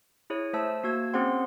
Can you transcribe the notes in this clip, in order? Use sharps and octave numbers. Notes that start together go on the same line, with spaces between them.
E4 G#4 C#5
A3 C5 E5 A5 E6
A#3 F#4 E6 G#6
C4 C#4 G#4 C5 F#5 C6